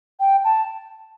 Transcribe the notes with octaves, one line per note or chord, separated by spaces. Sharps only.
G5
A5